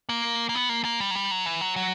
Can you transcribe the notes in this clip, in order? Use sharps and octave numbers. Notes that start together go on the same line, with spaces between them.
A#3
A#3
B3
A#3
A#3
G3
F#3
G3
F#3
E3
F#3
F#3